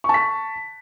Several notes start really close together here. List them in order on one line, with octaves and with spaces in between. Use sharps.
C#6 A5 B6